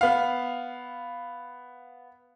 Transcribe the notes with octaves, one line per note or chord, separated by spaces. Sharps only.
B3 F5